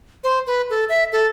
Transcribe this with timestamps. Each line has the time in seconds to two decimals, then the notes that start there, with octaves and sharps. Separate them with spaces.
0.24 C5
0.47 B4
0.70 A4
0.89 E5
1.12 A4